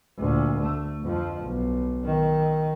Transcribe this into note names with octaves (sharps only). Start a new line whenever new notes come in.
D2 A#2
A3
F2 F3
B1
D#3